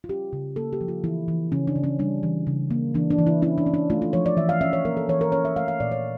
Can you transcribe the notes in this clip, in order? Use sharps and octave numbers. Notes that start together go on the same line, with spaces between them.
F4
C#4 G4
C#3
A#3 A4
G4
F3
F4
E3 E4
E3
C#3 C#4
D4
C#3
C#4
G3 D4
E3
C#3
A#3
E3 D4
D4
E3
E4
C#4 E4
D4
C#4
D4
A3 F4
F4
F3 C#5
D5
E3 E5
F5
C#4 E5
C#5
A#3 A#4
A4
E3 C#5
A#4
C#4 C#5
E5
A3 F5
F5
A#2 D5
C#5